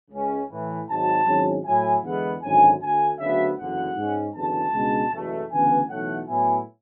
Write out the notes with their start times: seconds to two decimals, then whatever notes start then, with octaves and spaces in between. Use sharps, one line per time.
0.11 C#2 C#3 G#3 C#4
0.50 A2 E3 A3
0.88 G#1 G#2 F#3 A5
1.26 G#1 G#2 F#3 C#4 E4
1.65 A2 F#3 A3 E4 G#5
2.03 E2 D3 G#3 B3 E4 F#5
2.41 G#1 F#2 D3 G#5
2.81 D2 D3 A3 G#5
3.19 D2 C#3 F#3 B3 E5
3.57 F#1 E2 D3 F#5
3.96 G#2 G#3 C#4
4.34 F#1 E2 D3 A5
4.73 C#2 B2 G#3 D4
5.11 F#1 E2 B2 A3
5.50 D2 C#3 E3 B3 D4 G#5
5.89 B1 A2 E3 A3 F#5
6.27 A2 F#3 B3 E4 G#5